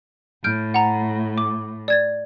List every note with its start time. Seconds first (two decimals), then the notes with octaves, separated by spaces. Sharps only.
0.44 A2 F6 G6 D7
0.74 F#5 A#5
1.38 D6
1.88 D5 G#6 A6